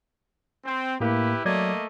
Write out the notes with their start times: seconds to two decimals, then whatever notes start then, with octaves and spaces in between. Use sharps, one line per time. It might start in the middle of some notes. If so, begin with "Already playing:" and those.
0.65 C4
1.00 A2 A#3 E4 G4 B4
1.45 F#3 A3 A#3 D5 D#5 G#6